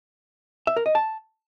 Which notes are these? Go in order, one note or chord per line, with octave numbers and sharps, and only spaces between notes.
E5
A#4
D#5
A5